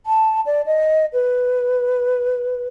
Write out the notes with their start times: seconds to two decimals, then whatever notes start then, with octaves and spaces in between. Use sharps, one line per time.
0.06 A5
0.46 D5
0.66 D#5
1.13 B4